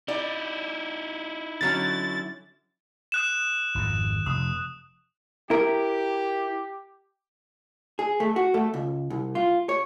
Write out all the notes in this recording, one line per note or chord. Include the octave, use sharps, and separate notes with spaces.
D#4 E4 D5
D3 F#3 C#4 A6
D#6 F#6 E7
G#1 F2
F1 D#6
E4 G4 A#4
G#4
A3
F#4
A3
C#2
C2
F4
C#5